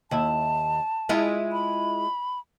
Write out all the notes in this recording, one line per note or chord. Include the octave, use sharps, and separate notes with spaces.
D#2 E4 A5
G#3 E4 F4
B5